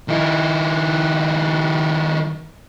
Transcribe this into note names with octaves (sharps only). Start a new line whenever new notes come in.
D#3 E4